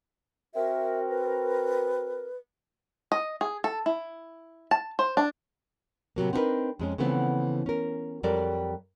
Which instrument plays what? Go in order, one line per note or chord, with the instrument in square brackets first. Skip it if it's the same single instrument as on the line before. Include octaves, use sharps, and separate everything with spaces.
[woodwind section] C4 F#4 A#4 [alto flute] E5
[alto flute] B4
[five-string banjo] D#5
G#4
A4
E4
A5
C5
D4
[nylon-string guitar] A2 C3 F#3 A#3
C4 D4 D#4 G#4 A#4 B4
F2 G#3 C#4
C#3 E3 F3 A3 B3 C4
C#4 A#4
F2 F#3 G3 A4 A#4 D5